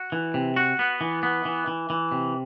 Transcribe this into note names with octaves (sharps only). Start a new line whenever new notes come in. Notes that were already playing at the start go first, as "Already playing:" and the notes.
Already playing: F#4
E3
C3
F#4
B3
E3
B3
E3
E3
E3
C3